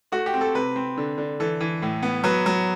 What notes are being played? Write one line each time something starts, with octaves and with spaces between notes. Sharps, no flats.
A3 F#4
G4
C4
A4
C3 B4
C4
D3
D3
E3 A4
E3
A2
B3
F#3 B4
F#3